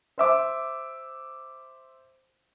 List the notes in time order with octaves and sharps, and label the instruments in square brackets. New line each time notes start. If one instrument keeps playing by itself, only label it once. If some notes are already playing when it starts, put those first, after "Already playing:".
[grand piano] C5 E5 D6